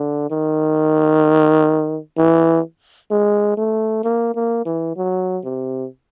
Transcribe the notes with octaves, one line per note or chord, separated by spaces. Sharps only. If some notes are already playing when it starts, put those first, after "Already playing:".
Already playing: D3
D#3
E3
G#3
A3
A#3
A#3
E3
F#3
C3